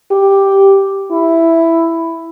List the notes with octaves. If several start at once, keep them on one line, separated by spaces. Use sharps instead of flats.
G4
E4